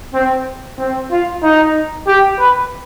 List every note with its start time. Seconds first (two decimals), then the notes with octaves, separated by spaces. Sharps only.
0.14 C4
0.79 C4
1.12 F4
1.43 D#4
2.08 G4
2.40 B4